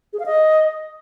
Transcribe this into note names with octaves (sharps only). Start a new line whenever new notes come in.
G#4
F5
D#5